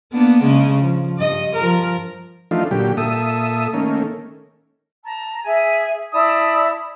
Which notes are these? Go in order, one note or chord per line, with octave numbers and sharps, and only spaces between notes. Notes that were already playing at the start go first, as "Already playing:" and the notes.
A#3 B3 D4
C#3 G#3
F3
G2 D#5
F3 A#4
E3 F3 A3 D4 D#4 F4
A#2 D3 F#3 G3 G4
A#2 A4 E5 D#6
D#3 A3 A#3 C#4
A5 A#5
G#4 E5 G#5
E4 D5 A5 D#6